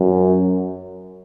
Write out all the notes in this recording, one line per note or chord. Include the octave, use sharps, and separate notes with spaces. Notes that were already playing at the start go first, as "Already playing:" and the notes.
Already playing: F#2